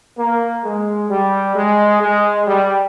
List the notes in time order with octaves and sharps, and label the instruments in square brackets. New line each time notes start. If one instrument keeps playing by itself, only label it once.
[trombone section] A#3
G#3
G3
G#3
G#3
G3